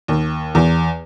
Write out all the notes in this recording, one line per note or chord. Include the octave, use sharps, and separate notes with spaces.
D#2
E2